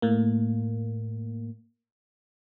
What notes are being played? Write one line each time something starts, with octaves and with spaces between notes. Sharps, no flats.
A2 A#3